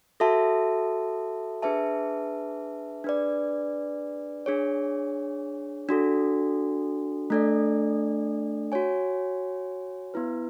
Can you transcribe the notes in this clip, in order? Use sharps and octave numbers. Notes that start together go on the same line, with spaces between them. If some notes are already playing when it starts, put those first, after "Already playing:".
F#4 A4 E5 A5
D4 G#4 B4 E5 A5
D4 G#4 B4 D5
D4 G#4 C#5
D4 F#4 A4
A3 D4 A4 D5
F#4 C#5 G#5
B3 E4 B4